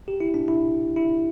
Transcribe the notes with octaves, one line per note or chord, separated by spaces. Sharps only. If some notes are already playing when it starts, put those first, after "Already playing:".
G4
E4
D4
E4
E4